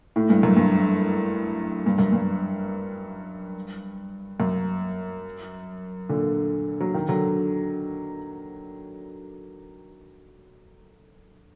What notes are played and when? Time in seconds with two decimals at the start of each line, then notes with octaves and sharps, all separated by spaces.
0.16 A2
0.30 G2
0.43 F#2
0.57 G2
1.86 G2
1.99 F#2
2.13 G2
4.40 F#2
6.09 A#2 D3
6.80 F#3
6.94 D#3
7.08 D3 F#3